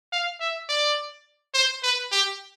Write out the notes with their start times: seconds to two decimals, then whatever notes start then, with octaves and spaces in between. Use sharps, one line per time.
0.13 F5
0.40 E5
0.69 D5
1.54 C5
1.83 B4
2.12 G4